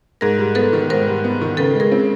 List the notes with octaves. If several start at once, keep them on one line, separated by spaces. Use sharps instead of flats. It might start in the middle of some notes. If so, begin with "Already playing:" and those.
G#2 G#4 A#4
G3
B3 A4 B4
D#3
G#2 A#4 C5
G3
B3
D#3
C#3 A4 B4
G#3
G#4 A#4
C4